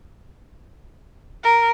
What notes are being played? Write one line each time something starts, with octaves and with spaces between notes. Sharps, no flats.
A#4